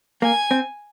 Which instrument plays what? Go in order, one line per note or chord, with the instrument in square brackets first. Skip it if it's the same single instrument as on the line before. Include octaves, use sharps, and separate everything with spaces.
[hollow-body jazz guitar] A#3 [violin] G#5
[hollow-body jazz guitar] C4